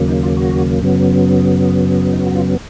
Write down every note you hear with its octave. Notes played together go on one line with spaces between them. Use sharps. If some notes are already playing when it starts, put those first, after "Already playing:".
Already playing: D#2 C#3 F#3 A#3
D#4
F4
F#4
F#2 C#3 F#3 B3
D#4
F#4
F4